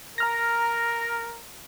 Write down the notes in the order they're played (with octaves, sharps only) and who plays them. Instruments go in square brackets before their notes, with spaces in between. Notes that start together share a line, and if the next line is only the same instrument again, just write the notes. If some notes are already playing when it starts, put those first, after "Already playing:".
[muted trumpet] A#4 [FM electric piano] A#5 F6 A#6